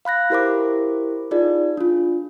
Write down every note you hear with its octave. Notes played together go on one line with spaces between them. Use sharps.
F5 B5 F#6 A#6
E4 G4 A#4 C5 B5 D6
D#4 F4 G#4 D5
D4 F4